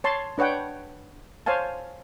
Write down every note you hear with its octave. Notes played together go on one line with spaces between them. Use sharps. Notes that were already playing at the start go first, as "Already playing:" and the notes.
C#5 A5 C6
D4 B4 C#5 F#5 G5
C5 C#5 F5 G#5 A5